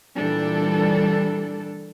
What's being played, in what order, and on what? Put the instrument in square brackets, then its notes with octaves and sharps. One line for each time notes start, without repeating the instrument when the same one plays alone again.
[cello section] A#2 E3 G3 D4 A4